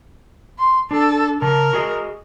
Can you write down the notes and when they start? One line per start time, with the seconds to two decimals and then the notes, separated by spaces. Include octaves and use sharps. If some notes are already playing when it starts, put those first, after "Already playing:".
0.59 C6
0.91 D4 A4
1.42 C#3 A#4 A5
1.73 F#4 G#4 D#5